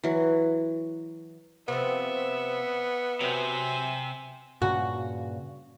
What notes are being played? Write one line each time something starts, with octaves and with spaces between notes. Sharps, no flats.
E3 F#3
C3 F3 B3 E5
C3 F#3 C5 E5 G#5
G2 A#2 C#3 F#4